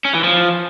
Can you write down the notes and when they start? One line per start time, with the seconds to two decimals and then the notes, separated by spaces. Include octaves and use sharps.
0.05 C#4
0.14 E3
0.24 F3